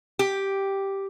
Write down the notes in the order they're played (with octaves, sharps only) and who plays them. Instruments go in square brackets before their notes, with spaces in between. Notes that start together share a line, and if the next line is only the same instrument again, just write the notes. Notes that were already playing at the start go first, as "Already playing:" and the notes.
[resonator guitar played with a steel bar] G4